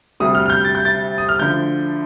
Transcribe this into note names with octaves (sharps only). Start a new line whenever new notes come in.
D2 C3 G3 D#6
F6
F6
G6
A6
G6
A6
D#6
F6
D2 D3 F3 G6